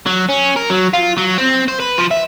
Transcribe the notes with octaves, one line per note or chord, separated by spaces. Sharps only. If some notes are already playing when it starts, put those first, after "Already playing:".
F#3
C#4
A#4
F#3
F4
F#3
C4
C5
B4
F3
E5